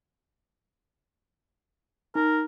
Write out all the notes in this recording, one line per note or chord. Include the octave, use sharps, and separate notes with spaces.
D#4 A#4